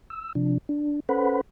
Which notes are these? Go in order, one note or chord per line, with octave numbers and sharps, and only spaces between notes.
E6
C3 F3 D4
D4
C#4 A4 B4 C5 F#5 B5